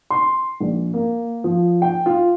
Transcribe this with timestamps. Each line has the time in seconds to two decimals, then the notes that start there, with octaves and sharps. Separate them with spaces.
0.10 C6
0.60 A#1
0.94 A#3
1.44 F3
1.82 G5
2.06 F4